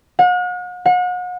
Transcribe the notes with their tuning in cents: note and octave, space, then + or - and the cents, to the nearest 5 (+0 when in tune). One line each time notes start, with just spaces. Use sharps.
F#5 -45
F#5 -40